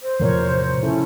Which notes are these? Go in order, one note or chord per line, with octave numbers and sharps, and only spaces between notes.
C5
E2 A2 C3 F3 A#4 C#5
C#3 C#4 E4 A4